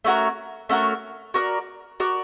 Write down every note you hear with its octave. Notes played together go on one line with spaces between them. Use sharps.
A3 C#4 F#4 A#4
A3 C#4 F#4 A#4
F#4 A#4 D5
F#4 A#4 D5